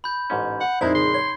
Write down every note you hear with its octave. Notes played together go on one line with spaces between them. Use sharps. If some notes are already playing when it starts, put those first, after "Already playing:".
B5 G6
A1 G#2 C#4
F#5
A#1 F2 G#3 D#4 E4 C5
C#3 C6
C#5